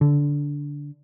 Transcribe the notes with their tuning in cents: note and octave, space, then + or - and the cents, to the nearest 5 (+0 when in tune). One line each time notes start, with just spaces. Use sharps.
D3 -15